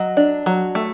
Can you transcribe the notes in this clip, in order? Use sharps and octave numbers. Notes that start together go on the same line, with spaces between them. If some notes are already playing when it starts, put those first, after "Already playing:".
Already playing: F#3 D#5
D4
F#3
A3